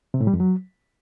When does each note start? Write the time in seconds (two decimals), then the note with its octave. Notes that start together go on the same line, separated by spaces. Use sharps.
0.14 C3
0.21 A2
0.27 G3
0.34 F2
0.40 F#3